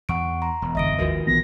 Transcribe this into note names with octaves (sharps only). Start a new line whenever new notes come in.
E2 F#5 C#6 D7
A#5 C6
E1
G#1 F#2 D3 D#5 E5 A#6 D7
G#1 D#2 D#3 F3 F#4 A#4 B4
A#1 E3 B3 A#6